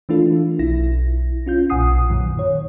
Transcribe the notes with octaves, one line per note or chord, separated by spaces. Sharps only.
E3 A3 D4 E4 F4 A4
B1 E4 A#6
C#4 F4 G6
B1 A#2 F#5 G#5 D#6 C7
F#2 A#2 D#3 F#3
D#3 C#5